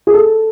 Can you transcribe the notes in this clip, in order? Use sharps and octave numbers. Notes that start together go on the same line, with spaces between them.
G#4
A4